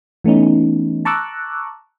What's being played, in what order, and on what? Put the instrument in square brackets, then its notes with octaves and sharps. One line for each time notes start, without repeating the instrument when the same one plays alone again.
[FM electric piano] E3 A3 B3 C#4 D#4
A5 A#5 C#6 D6 E6 F#6